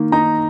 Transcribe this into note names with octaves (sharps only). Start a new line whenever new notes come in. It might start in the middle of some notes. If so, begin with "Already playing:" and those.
Already playing: D#3 A#3
D#4 A#5